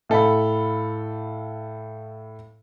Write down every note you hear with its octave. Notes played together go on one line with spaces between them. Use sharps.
A2 A4 F5 B5